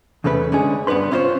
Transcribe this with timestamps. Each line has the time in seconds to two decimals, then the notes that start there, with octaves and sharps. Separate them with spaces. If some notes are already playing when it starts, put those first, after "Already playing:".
0.24 E2 C#3 A3 C#4 B4
0.52 D3 G#3 C#4 G#4
0.87 G2 B3 D4 B4 C6
1.11 C#4 E4 F4 A#4 C5 C#5